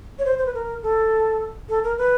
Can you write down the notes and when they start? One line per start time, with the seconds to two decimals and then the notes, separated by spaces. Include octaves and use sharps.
0.19 C#5
0.25 C5
0.38 C5
0.46 B4
0.54 A#4
0.83 A4
1.69 A4
1.84 A#4
1.98 B4